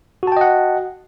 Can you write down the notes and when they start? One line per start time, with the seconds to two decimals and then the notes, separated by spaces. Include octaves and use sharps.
0.23 F#4
0.27 A5
0.32 G5
0.37 D#5
0.41 F#5